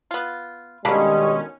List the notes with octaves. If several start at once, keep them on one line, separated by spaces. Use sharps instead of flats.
B3 F4
B2 D3 D#3 G3 G#3 A#3 C#4 B5